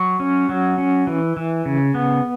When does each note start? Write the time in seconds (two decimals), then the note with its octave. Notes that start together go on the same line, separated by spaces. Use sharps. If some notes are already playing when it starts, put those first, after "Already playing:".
Already playing: F#3 C#6
0.20 C#4
0.49 F#3
0.78 C#4
1.07 E3
1.37 E3
1.66 C#3
1.94 B3